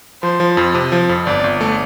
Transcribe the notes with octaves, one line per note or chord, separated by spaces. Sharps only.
F3 C5
F3
F2
C3
F3
F2
G1 D5
G1
A3